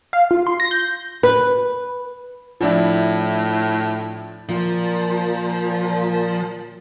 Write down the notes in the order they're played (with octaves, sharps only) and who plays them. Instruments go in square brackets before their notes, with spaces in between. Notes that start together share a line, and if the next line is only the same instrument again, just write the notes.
[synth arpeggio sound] F5
F4
C6
A#6
G6
[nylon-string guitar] B4
[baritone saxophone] A2 [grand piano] F3 D4 E4
[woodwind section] A#2 [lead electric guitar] F3